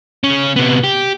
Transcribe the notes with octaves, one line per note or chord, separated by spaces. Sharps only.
C#3 C#4
C3 B3
G4